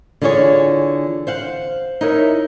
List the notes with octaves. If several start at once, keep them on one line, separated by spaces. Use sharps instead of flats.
D3 E3 F4 G#4 C5 C#5
C5 F5 F#5
D#4 E4 A#4 C#5 E5